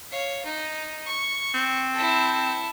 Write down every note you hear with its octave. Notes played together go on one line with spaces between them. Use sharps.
C#5 F5
D#4
C#6
C4
E4 A4